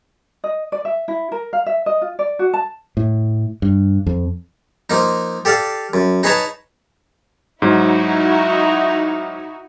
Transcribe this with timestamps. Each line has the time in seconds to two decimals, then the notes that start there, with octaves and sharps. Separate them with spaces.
0.44 D#5
0.72 D5
0.85 E5
1.08 E4
1.32 A#4
1.53 F5
1.66 E5
1.86 D#5
2.02 F4
2.19 D5
2.39 F#4
2.53 A5
2.97 A2
3.62 G2
4.07 F2
4.90 F3 A#3 D#4
5.45 G4 A4 D5 F5
5.94 F#2
6.23 D#4 G#4 B4 C#5 A5 A#5
7.62 G#2 F#3 D#4 E4 F#4